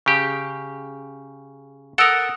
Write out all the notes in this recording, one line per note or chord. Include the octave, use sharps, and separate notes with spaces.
C#3 G4
A4 A#4 F#5 D#6 E6 D7